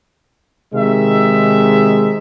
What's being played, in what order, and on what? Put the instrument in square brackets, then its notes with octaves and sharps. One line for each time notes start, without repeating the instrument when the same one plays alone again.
[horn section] C3 D#3 G#3 E5